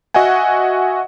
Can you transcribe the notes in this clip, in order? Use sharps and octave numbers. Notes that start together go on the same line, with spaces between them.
F#4 D#5 E5 F#5 G#5